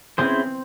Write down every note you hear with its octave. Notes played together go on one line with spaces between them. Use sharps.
C4 C#4 E4 G#4 C5